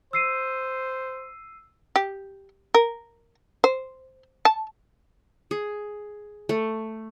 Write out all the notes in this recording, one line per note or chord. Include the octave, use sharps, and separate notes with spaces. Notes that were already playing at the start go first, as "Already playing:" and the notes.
C5 E6 C7 D#7
G4
A#4
C5
A5
G#4
A3